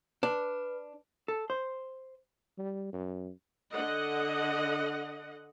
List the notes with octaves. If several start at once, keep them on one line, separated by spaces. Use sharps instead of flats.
D4 B4
A4
C5
G3
F#2
D3 D#5 F#5